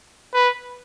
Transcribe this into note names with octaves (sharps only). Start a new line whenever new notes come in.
B4